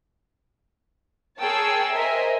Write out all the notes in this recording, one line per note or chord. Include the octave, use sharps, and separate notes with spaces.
G#4 A#4 C#5 G5 A5 E6
A#4 C5 D#5 E5 G#5